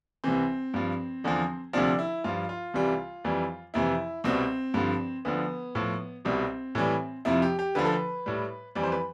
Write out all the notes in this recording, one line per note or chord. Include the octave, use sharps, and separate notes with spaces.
C2 C3 E3 C4
G2 F3
E2 D3 F3
D2 C3 F3 D4
E4
G2 F3 F4
F4
C2 C3 E3 G3
F2 E3 G3
F2 C3 E3 E4
C2 B2 G3 C4
G2 D3 F3
D2 D3 F3 B3
A2 F3
C2 B2 G3 C4
A2 E3 G3
F2 C3 F3 E4
G4
G4
D2 D3 F3 B4
A4
B4
A2 G3
F2 E3 G3 D5
C5
B4